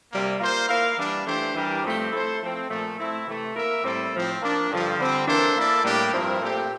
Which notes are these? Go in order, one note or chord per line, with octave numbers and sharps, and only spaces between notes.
C3 G3 A#3
A#3 F4 C5
A#3 E4 A#4 F5
E3 G3 D4
E3 A3 D4 G4 C5
E3 G3 D4 G4 A#4
G2 F3 A3 C4 G4
A3 E4 A4 C5
F3 A3 C4
A#2 F3 A3
A3 C4 E4
C3 E3 A3
A#3 E4 A#4 E5
A2 G3 C4 E4 A4
A2 F3 C4
F3 A#3 D4
G2 D3 F3
D3 G3 C4
E3 A#3 D4 A4 C5
A#3 E4 A4 D5
A2 G3 A#3 D4 G4
G2 F3 C4 E4 A#4
A#2 A3 C4 G4